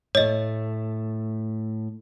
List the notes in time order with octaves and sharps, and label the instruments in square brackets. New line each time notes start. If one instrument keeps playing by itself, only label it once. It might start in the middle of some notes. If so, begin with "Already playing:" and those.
[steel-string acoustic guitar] A2 A3 [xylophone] C#5 D#5